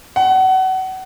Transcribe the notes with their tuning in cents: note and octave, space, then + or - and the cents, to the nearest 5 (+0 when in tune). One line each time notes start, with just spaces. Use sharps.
F#5 +30